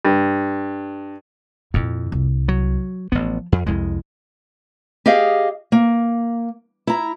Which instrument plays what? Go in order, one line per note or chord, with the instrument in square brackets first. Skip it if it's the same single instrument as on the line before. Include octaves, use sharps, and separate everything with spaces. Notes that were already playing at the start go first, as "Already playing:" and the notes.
[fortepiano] G2
[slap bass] F2 [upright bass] A#2 E4
[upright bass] C2
[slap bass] F#3
[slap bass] A1 B3 [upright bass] F3
[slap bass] F2
[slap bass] C2 F2 G#3 [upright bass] E4
[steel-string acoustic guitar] G4 G#4 D#5 F5
A#3
E4 A#5